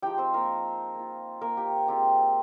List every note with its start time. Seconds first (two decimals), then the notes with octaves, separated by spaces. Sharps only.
0.02 F3 G#3 D#4 G4 G5
0.18 C4 C5
0.34 A#3 A#4
0.95 A#3 F4
1.41 A#3 A#4
1.57 G4
1.88 G#3 C4 F4 G4